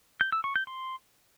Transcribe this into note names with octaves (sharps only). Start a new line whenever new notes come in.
G6
E6
C#6
G6
C6